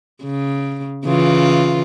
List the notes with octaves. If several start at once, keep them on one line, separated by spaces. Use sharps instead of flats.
C#3
C#3 E3 F4